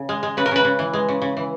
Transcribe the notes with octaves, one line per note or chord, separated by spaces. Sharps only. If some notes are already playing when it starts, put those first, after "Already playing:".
Already playing: C#3
G#3
G#3
C#3 B4
A#4
C#3 B4
C#3
E3
G#3
C#3
C#3
E3